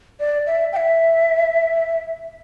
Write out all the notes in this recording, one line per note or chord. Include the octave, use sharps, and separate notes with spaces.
D5
E5
G5
E5